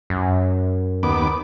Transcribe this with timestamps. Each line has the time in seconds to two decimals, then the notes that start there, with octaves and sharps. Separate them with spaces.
0.10 F#2
1.03 D#2 B3 D6